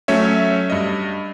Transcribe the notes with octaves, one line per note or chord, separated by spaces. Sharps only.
F#3 A3 C#4 C#5 E5
G2 D#5